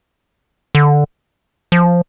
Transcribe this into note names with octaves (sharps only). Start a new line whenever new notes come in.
D3
F3